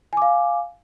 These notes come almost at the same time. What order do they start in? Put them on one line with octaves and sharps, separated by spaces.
G#5 D6 F5